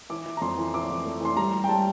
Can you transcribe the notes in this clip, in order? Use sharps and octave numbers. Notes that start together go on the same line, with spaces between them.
E3 D6
E3
A#5
F2 C6
E3
E3 D6
F2
A3
E3 C6
G3 A#5
G3
G5
G3 A5